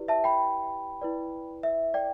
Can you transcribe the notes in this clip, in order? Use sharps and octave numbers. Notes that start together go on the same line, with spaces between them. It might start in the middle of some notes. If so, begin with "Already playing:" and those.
Already playing: E4 G4 B4 D5
E5 A5
G5 B5
E4 B4 D5
E5
D5 G5